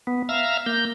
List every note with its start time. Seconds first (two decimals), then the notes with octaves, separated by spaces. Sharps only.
0.07 B3
0.29 E5 F5 A#5 E6 F6
0.66 A#3 G6